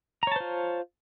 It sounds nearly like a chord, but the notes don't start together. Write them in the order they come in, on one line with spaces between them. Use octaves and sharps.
A#5 C#5 A5 C5 F4